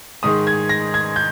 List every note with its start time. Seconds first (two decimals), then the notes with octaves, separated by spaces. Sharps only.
0.23 G#2 D#3 G#3 D#6
0.47 G#6
0.69 A#6
0.94 G#6
1.16 G6